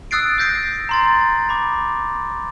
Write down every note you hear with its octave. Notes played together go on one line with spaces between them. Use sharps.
D#6 E6 F#6 A6 C7 D7
D#6 F#6 G6 A#6 C7 D7
A#5 C6 A6
B5 D6